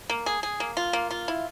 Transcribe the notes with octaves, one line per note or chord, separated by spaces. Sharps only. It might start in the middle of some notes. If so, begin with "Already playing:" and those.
A#3
G#4
G#4
A#3
F4
A#3
F4
E4